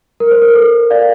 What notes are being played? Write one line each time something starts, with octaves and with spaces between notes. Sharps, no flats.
A#4
C5
A#4
A4
D5 F5